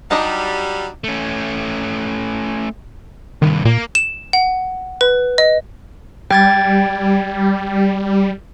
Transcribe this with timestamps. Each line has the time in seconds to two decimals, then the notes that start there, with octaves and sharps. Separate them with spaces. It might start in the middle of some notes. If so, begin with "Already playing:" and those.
0.11 F#3 G3 D4 D#4 A5
1.04 A3 C#4
3.42 C2 G2 D#3
3.65 A#2 A#3
3.95 E7
4.33 F#5
5.01 B4
5.38 D#5
6.30 G3 G5 G#6 A6